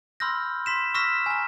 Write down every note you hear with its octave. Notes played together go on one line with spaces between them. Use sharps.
B5 C6 E6 F6 G6 A#6
C6 B6 E7
C#6 E6 F6 A#6 B6 E7
G#5 A#5